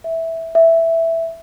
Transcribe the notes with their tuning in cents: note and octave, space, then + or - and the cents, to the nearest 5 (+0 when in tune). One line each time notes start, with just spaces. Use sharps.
E5 -10
E5 +0